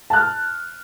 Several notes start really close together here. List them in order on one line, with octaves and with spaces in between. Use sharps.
A5 F#6 F6